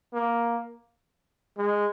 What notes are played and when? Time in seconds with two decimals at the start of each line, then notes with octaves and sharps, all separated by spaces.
0.13 A#3
1.57 G#3